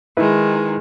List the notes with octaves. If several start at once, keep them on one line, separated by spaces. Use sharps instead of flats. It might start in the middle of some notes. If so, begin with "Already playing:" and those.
D#3 G#3 D#4 E4 B4